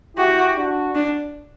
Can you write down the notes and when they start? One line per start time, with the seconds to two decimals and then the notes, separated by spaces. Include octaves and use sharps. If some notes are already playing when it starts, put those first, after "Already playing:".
0.17 E4 F#4 G4
0.56 D4 F#4
0.95 D4